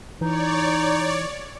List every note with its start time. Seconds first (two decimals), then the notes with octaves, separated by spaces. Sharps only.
0.21 E3 D#4 C#5 D5